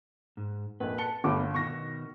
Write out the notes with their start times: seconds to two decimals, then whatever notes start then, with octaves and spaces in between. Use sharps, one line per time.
0.37 G#2
0.80 A#1 F2 B4
0.98 A5 C#7 G7
1.24 G1 A3 B3 C#4 B5 D6
1.54 B2 D#3 C#6 A#6